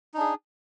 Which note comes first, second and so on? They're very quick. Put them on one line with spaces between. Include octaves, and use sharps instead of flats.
D#4 D4 G#4